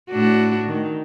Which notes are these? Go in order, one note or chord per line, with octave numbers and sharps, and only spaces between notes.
A2 D4 F#4
D#3